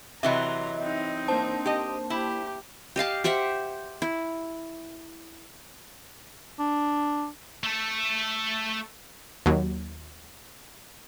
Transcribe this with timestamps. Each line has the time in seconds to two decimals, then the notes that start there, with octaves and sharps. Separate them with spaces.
0.23 C3 E3 F#3 D#5 E5 A#5 C6
0.79 C4 D#4
1.28 A#3 D4 C5 A5
1.66 G4 D#5
2.10 E4 G4
2.96 G4 D#5 F5 A5
3.24 G4 C5 E5 F#5
4.02 E4
6.59 D4
7.63 A3 A4
9.46 D#2 F#3